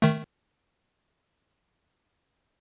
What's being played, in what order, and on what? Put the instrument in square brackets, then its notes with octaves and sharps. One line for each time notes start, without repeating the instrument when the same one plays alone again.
[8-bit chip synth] D#3 A3